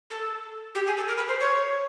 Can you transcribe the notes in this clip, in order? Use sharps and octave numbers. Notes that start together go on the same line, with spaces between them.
A4
G4
G#4
A4
A#4
B4
C5
C#5